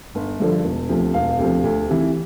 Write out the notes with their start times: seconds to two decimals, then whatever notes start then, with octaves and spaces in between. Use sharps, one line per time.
0.15 G1
0.40 G2 D3 F3
0.64 E1
0.89 D2 C3 F3
1.14 E1 F5
1.39 D2 C3 F3
1.64 D2
1.89 C3 E3